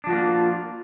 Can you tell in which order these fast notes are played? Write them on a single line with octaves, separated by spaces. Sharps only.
D4 F3 F#4 A#3 F4